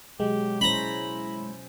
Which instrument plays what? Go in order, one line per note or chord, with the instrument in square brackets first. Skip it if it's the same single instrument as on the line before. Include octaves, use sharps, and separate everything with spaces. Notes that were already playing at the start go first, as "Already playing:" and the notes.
[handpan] B2 F#3 [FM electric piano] G#3 [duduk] G4
[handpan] C#4 C5 [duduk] E4 [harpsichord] A#5 B5